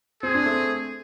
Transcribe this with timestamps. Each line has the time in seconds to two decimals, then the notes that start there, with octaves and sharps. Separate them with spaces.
0.23 C4 G#4
0.34 D4
0.46 A3 C4